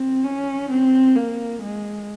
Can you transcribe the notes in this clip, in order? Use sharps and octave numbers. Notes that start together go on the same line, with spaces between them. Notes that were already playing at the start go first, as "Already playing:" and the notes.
Already playing: C4
C#4
C4
A#3
G#3